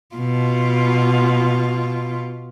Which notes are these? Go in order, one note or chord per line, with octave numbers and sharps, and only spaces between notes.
B2 F4